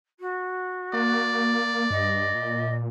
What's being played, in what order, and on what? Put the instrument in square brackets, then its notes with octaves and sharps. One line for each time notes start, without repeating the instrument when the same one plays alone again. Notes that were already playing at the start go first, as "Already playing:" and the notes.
[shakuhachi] F#4
[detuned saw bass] A#3 [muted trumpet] D5
[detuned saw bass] G2 [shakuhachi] D#5
[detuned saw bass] A#2